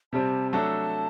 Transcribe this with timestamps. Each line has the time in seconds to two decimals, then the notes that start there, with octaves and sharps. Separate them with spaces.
0.13 C3 G3 C4 A5
0.52 F#3 A3 D4 A4 A5